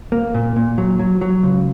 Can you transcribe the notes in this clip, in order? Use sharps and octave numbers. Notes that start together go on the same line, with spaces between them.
A#3
A#2
A#2
F#3
F#3
F#3
C#2